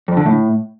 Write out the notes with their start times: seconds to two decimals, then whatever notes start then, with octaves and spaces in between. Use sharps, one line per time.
0.08 F2
0.17 D3
0.26 A2